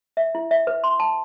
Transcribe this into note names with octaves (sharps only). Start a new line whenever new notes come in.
E5
E4
E5
B4
C6
A5